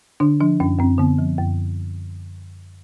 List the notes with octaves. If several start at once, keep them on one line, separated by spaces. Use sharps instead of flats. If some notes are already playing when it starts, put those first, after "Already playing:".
D3 D4
F3 D4
F#2 C#4
F#2 C4
D3 B3
F3
F#2